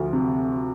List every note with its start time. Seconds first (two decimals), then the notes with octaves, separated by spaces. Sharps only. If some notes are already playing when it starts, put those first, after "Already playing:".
Already playing: D2 F3
0.13 C3